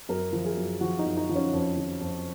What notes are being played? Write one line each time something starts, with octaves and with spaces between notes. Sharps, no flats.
F#2 A#4
F3
G#4
F#2
F3 F#4
D#4
F#2
D#4
F3
C#4
F2
F3
F2